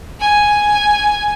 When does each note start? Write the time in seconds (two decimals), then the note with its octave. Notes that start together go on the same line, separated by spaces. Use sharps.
0.21 G#5